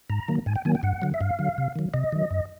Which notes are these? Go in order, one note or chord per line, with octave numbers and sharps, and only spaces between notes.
G#2 A#5
D#3 F#3 A#3
G#2 G#5
G5
D#3 F#3 A#3 G#5
G5
G2 F#5
D3 F#3
E5
G2 F5
D3 F#3
C3
D#3 F#3
C3 D#5
D#3 F#3
F#2